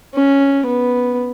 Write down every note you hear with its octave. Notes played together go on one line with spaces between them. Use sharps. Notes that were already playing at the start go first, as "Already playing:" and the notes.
C#4
B3